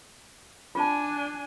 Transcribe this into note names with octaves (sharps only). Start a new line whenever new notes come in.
D4 F4 G#5 A5